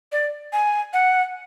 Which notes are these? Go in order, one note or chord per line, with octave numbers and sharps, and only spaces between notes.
D5
G#5
F#5